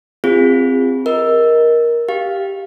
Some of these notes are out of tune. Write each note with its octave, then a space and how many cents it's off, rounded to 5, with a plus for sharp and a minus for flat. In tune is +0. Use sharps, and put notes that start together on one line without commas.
C4 +0 F4 -5 G#4 -30
A#4 +15 D#5 +20
G4 +0 F5 +0